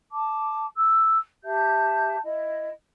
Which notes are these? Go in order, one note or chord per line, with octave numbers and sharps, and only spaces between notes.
A5 D6
E6
G4 E5 A5 G6
E4 D#5